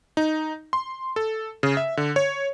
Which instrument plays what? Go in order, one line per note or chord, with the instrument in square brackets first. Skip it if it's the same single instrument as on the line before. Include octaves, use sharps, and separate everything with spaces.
[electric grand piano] D#4
C6
A4
C#3
E5
D3
C#5